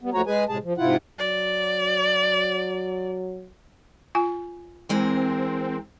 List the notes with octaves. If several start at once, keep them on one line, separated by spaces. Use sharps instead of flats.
G3 B3
D#2 F3 A3 F#4 C#5 A#5
G#3 G#4 B4 G#5
A2 C3 G#3 G#4 A5
F3
G#2 C3 E4 F4 F#5
F#3 D5
F4 G#5
E3 G#3 C4 A#4